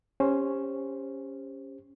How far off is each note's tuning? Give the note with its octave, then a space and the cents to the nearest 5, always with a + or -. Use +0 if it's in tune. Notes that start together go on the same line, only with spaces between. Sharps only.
C#4 +0 G4 +25 C5 +10